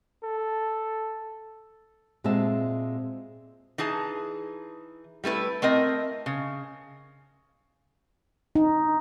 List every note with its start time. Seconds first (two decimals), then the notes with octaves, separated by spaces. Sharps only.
0.24 A4
2.24 A#2 G#3 C4 F#4 E5 A5
3.78 E3 D#4 G#4 A5
5.24 G3 A3 E4 B4
5.62 A3 C4 A#4 D#5
6.26 C#3
8.55 D#4